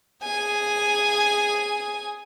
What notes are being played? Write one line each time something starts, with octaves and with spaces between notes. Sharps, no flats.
G#4 G#5